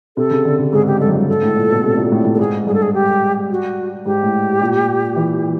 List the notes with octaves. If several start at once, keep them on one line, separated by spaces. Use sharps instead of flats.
C3 A4
C#3
D3
C#3
G#2 G#4
G4
G2 A4
F#2
G2
G#2 A4
A2
A#2
B2
C3
A#2
A2
A2
A4
G#2 G#4
G2 G#4
A4
G#4
G4
F#4
G#2 G4
A2
A#2
E3